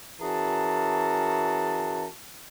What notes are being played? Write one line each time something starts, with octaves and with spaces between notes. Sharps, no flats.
E3 C#4 F#4 G#4 A#4 A5